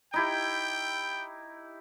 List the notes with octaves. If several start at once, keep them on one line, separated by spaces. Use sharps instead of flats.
D#4 E4 G4 G5